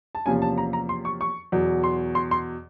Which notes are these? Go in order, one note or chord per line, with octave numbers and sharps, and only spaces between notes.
A5
E2 C3 F3 A#3 C#4 G#5
A5
A#5
A#5
C6
C#6
C#6
E2 B2 F#3
C6
C6
C6